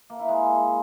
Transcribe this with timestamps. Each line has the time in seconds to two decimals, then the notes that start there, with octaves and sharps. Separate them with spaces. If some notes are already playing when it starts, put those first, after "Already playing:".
0.10 A#3
0.19 E4
0.29 G#3